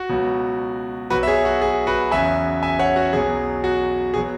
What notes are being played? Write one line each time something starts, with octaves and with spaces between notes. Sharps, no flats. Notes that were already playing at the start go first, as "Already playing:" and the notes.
Already playing: F#4
C#2 B2 F#3
B1 B2 F#3 F#4 B4
E5
G#4 C#5
F#4
G#4
F#4 B4
E2 C#3 F#3 E5 G#5
E5 G#5
C#5 F#5
F#4
B1 B2 F#3 G#4
F#4
B2 F#3 G#4